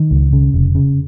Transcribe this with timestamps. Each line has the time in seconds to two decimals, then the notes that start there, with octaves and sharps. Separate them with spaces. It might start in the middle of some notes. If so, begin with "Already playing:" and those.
Already playing: D#3
0.11 C#2
0.33 C#3
0.54 F1
0.75 C#3